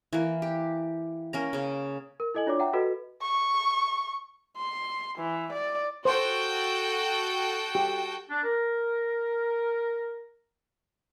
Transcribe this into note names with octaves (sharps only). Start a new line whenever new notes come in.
E3 A#3
G4
A#3 C#4 A#5
C#3 C#4
A#4
E4 A4 D#5 G#5 F#7
D4 F4 C#5 D5 D6
E5 F#5 G5 A#5
F#4 A4 B4 D#5
C#6
C6
E3
D5
F#4 A4 C5 G5
G4
D4
A#4